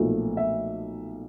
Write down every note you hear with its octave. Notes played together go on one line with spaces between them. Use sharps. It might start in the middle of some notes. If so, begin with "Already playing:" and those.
Already playing: B1 A#2 F3 A3
E5